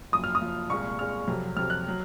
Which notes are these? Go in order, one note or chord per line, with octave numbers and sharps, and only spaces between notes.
F#1 F#2 F3 D#6
F6
D#6
F#1 F#2 F3
C2 A#2 G#3 C#6
C2 A#2 G#3 F6
F2 C3 F#3
F2 C3 F#3 F6
F#6
F#3